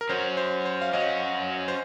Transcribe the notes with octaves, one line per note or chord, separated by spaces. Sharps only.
A#4
F#3 C#4 F#4 C5
C5
C5
F5
F#3 C#4 F#4 D#5
C5